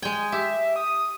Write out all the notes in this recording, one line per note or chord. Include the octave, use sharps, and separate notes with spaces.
G#3 G5 G#5
G4 E5
D#6